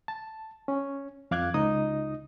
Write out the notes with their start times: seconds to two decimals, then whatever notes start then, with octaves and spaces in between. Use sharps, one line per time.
0.08 A5
0.68 C#4
1.31 F2 F5 D6 F#6 G#6
1.54 C#2 D#4 D#5 D#6